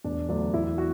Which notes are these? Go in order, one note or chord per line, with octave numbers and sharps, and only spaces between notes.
E1 D4
D2 D3 F#3 D4
E1 E4
F#4